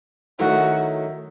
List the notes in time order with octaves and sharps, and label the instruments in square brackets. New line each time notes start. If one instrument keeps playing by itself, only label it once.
[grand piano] D#3 F#3 A3 E4 [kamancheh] F#4